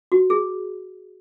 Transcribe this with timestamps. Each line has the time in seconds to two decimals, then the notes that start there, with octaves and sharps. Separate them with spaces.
0.12 F#4
0.30 G#4